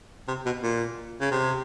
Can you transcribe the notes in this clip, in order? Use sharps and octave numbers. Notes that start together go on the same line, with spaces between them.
C3
B2
A#2
C#3
C3